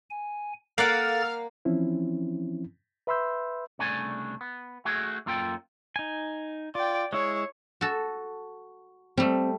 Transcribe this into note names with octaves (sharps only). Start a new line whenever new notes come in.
G#5
A#3 A4 D5 F5 F#5 A#5 A6
E3 F3 C4 C#4 E4
B4 E5 B5 C6 E6 G6
C2 C#3 A3 D4 G#5
B3
A3 F#4 G#4
F#2 A#3 F4 A4 G5
D#4 G#5
F4 D5 G5
G#3 E4 G#4 C#5
F#4 A4
G3 A3 C4